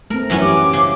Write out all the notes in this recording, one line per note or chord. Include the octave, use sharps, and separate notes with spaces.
A3 C4 A#4
F#2 E3 F#3 B3 C#4 E4
G4 D6
C#3